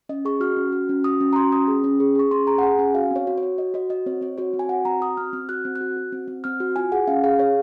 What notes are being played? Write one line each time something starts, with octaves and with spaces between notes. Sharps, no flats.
C#4 D#5
G#4 C#6
F#4 F6
C#4
F#4
C#4
F#4 D#6
C#4
A#5
F#4 C6
C#4 D#6
G#4
C#4
G#4
G#4 C#6
C#4 C6
G#4 A#5
F#5
G#4 G#5
C#4 G#5
F#4 F5
C4 C#5
F#4
C#5
F#4
F#4 D#5
F#4 D#5
F#4 D#5
C4 C#5
C4 C#5
F#4 C#5
C4
G#5
F#4 F#5
C4 A#5
F#4 D#6
C4 F6
C4 F6
F#4 F#6
C4
F#6
F#4
F#4
C4
C4
C4 F6
F#4
F4 G#5
G#4 F#5
C#4 F5
G#4 F5
G#4 C#5